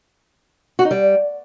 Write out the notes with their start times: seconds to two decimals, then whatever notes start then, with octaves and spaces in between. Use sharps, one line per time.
0.79 F#4
0.85 D#4
0.91 G3